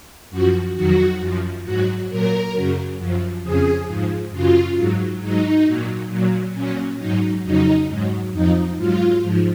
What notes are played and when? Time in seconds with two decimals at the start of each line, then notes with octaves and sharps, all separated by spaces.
0.30 F#2 F3 F#4
0.75 F2 D#3 F#3 F#4
1.20 F#2 F3
1.64 G#2 F#3 F#4
2.09 A#2 F#3 A#4
2.53 F#2 C#3 F#3
2.99 F#2 F3
3.42 F2 C#3 F3 G#4
3.87 G#2 F3
4.31 F#2 C#3 F#3 F4
4.76 G#2 F#3
5.21 G#2 F#3 D#4
5.66 A#2 F#3
6.10 A#2 F#3
6.54 A#2 F#3 C#4
6.99 G#2 F#3 D#4
7.44 F2 C#3 F#3 D#4
7.88 G#2 F#3
8.32 F2 F3 D#4
8.77 G#2 F#3 F4
9.21 G#2 F3